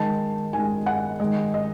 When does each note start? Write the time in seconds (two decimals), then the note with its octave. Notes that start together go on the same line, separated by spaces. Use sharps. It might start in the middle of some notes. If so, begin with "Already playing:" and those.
Already playing: D#3 G#3 A5
0.53 D#3 G#3 G#5
0.86 F#5
1.20 D#3 G#3 D#5
1.54 D#5